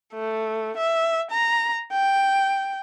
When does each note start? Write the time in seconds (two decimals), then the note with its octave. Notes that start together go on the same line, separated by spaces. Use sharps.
0.14 A3
0.77 E5
1.31 A#5
1.93 G5